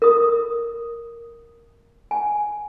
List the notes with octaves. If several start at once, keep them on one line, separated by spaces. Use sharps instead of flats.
A#4 D#6
G#5